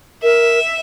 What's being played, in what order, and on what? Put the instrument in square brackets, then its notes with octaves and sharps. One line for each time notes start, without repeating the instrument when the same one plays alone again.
[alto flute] A#4 [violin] E5